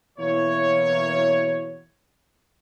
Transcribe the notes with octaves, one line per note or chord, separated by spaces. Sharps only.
B2 E3 F#3 A#3 E4 C#5